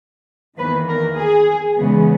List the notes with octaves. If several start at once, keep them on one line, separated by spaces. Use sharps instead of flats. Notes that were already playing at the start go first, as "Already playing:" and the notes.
E2 D#3 A#3 B4
A#4
G#4
E2 C#3 G#3 B3